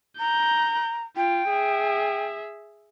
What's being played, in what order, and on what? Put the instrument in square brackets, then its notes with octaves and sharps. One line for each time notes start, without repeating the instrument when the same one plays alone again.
[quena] A#5 [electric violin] G6
[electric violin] F4 [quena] G5
[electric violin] G#4 E5